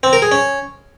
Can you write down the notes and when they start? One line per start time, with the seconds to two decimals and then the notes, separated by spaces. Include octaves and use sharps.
0.03 C4
0.13 A#4
0.22 G#4
0.32 C#4